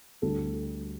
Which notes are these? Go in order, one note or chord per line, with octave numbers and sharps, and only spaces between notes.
D2 D3 G3 A4